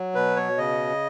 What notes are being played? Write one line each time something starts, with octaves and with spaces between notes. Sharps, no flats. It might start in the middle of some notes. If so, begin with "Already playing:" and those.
Already playing: F#3
B2 B4
C#5
C#3 D#5